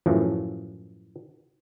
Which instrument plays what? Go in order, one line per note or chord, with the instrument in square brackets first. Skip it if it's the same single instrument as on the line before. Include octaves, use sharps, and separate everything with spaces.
[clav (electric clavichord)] F#2 A2 E3 F3